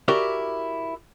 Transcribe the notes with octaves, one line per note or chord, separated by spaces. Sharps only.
E4 F#4 G4 A#4 D5